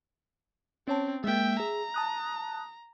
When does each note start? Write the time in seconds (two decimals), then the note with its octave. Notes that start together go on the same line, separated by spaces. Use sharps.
0.88 C4 C#4 C#5 A5
1.24 G#3 A#3 E5 G5
1.60 G#4 A#5
1.94 A5 D#6 F#6